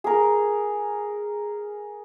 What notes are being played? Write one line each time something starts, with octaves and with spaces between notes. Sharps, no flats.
G#4 A#4